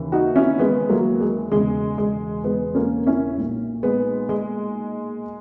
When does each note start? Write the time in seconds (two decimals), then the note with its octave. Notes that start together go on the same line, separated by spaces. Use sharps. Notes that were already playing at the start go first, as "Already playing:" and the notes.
Already playing: D#2 C#3 E3
0.12 D#4 F#4
0.36 C#4 E4
0.59 G#3 B3
0.89 F#3 A#3
1.20 G#3
1.52 E1 E2 C#3 G#3
1.98 G#3
2.44 G#3 B3
2.75 A#3 C#4
3.06 C#4 E4
3.37 B1 A#2
3.83 G#3 B3
4.29 G#3